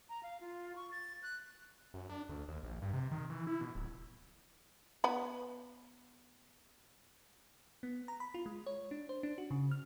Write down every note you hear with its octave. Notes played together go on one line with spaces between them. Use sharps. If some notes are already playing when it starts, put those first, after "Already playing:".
A#5
F5
F4
C#6
A6
F#6
F#2
D4
D2
D#2
A#1
G2
C3
D#3
E3
E4
B2
D1
B3 B4
B3
A#5
B5
F4
G#3
C#5
D4
C5
D4
F#4
C#3
F6